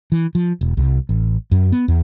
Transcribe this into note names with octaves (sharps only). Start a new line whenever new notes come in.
E3
F3
E1
C2
A1
F#2
B3
E2